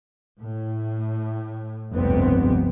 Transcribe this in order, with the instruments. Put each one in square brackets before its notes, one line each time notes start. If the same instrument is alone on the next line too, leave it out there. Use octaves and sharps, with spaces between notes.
[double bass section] A2
F1 C#2 G2 B3 C4